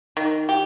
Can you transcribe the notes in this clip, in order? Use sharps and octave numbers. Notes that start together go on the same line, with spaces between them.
D#3
G4